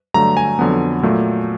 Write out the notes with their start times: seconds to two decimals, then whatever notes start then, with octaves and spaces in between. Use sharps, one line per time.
0.14 G2 D3 F#3 A3 A#5
0.37 G#5
0.59 F2 D3 F#3 B3
1.03 A#2 F#3 A3